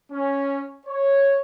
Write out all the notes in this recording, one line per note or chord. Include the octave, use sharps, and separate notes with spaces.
C#4
C#5